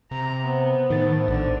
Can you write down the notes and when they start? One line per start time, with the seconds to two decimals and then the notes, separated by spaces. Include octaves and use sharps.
0.11 C3 A#5
0.45 B3 C5
0.90 A2 D#3 A6
1.28 A#1 D3